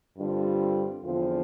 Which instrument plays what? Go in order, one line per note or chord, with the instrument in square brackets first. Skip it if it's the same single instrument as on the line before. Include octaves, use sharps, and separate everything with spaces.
[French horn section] G2 D3 G3 C4 F4
E2 D3 F3 C4 F4